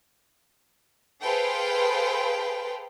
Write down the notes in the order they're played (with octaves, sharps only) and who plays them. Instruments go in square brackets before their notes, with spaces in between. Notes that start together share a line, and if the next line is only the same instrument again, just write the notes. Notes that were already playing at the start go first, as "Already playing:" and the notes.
[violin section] G#4 A4 B4 C5 F5 G5